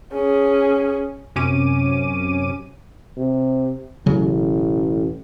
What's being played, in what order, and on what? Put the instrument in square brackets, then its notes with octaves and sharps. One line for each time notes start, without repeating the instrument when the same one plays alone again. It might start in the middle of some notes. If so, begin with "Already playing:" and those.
[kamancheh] C#4 G#4
[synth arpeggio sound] F#2 C3 C#4 D6 D#7
[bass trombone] C3
[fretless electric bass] E1 C#3 F#3 [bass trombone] A1